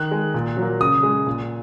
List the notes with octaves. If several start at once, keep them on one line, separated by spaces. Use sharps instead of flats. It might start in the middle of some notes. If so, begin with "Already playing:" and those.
Already playing: D#3 F#6
G#3
A#2
F#3
A#3
C#3 D#6
G#3
A#2